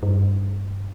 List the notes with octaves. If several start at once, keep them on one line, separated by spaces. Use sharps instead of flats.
G2